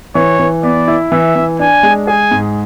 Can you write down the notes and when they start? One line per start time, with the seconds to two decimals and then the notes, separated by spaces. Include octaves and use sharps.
0.15 E3 C#5
0.39 E3
0.63 B3 D5
0.88 E4
1.12 E3 E5
1.36 E3
1.59 D4 G#5
1.83 G#3
2.07 G#4 G#5
2.31 G#2